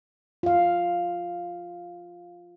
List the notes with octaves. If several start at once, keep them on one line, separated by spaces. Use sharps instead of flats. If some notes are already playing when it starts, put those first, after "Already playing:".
F4 F5